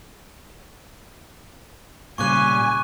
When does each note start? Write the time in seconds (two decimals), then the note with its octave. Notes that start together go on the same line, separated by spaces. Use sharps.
2.18 A#2 C#3 G3 G#5 C#6 D6 F#6